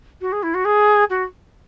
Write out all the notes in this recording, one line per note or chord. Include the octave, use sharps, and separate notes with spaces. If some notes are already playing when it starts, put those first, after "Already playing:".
F#4
G#4
E4
F#4
G#4
F#4